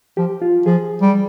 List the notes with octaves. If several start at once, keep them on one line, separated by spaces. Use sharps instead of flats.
F3 G4
F4
F3 G#4
G3